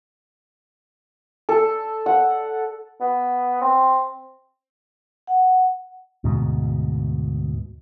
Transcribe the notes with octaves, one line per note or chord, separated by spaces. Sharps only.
A4
F#5
B3
C4
F#5
D2 G#2 B2